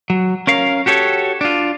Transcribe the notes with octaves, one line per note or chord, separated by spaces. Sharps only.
F#3
C#4 A#4 F5
F#4 G4 A4 C#5
D4 F4